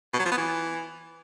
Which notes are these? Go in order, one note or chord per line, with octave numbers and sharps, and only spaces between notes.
B2
F#3
F3
B3
E3